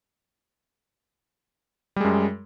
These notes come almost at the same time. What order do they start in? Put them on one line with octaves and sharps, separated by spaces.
G3 G#3 F#2